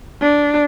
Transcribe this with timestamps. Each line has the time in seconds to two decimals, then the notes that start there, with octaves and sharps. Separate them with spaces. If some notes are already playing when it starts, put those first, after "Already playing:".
0.21 D4